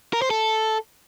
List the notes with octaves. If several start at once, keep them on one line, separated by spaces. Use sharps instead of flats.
A#4
C5
A4